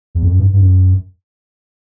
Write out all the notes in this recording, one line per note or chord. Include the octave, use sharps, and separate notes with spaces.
E2
F2
F#2
G2
G2
F#2